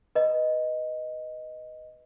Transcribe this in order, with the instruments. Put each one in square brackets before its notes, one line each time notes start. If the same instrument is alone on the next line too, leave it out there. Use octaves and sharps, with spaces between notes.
[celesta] B4 D#5